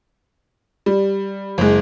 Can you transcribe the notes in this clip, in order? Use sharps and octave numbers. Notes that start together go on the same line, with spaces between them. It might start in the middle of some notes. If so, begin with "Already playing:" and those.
G3
F#1 G#3